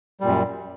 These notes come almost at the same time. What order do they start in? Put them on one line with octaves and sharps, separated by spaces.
G3 A#2 F#2